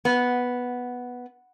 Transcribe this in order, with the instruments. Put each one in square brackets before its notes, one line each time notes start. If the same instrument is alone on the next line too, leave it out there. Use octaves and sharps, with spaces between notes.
[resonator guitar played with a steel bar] B3